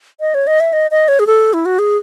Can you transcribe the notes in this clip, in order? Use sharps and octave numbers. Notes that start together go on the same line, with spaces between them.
D#5
C#5
D#5
E5
D#5
D#5
C#5
G#4
A4
E4
F#4
G#4